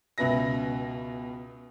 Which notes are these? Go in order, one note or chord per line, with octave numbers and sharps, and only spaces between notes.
C#2 B2 B4 E5 A#6